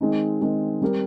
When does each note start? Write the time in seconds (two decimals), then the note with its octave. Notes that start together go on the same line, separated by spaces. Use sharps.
0.01 D#3 G#3 C4 D#4
0.41 D#3 G#3 C4 D#4
0.82 G3 C4 G4 A#4